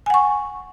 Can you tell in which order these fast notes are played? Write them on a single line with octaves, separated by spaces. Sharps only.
G#5 F#5 C#6